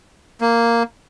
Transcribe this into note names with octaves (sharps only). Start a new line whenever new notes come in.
A#3